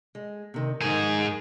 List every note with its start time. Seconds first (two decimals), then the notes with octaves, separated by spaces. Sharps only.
0.15 G#3
0.54 C3 D#3
0.82 F2 G#2 D#3 G#4